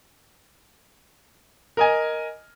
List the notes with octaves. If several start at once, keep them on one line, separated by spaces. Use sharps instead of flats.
A#4 D#5 G#5